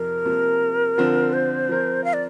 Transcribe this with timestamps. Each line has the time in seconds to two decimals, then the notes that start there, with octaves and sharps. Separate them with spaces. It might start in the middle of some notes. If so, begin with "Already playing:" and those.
Already playing: F2 C3 F3 A#4
0.25 C3 F3 A#3
0.98 D3 F3 C4 F4
1.33 C5
1.69 F3 C4 A#4
2.04 F5
2.13 D5